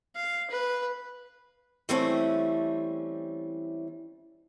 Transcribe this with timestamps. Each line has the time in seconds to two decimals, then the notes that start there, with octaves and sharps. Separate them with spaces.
0.16 F5
0.50 B4
1.89 E3 G3 A3 C4 C#4